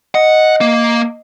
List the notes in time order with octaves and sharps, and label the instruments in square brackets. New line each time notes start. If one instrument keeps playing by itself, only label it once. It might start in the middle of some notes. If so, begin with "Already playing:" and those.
[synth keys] D#5 [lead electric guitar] F#5
[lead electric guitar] A#3